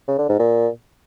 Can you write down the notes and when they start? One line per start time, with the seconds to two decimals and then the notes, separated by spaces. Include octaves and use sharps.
0.08 C#3
0.19 D3
0.29 G#2
0.40 A#2